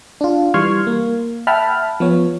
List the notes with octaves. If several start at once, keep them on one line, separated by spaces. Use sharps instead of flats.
D4 F4
E3 G3 C6 C#6 F6 G#6
A#3
E5 F#5 G5 A5 B5 F6
F3 B3 C#5